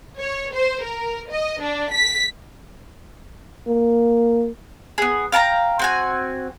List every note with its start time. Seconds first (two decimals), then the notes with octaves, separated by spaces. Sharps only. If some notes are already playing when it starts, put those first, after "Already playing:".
0.19 C#5
0.53 C5
0.84 A#4
1.31 D#5
1.62 D4
1.92 B6
3.67 A#3
4.98 B3 G#4
5.32 F5 G5 A5 A#5
5.79 C4 F#4 G#5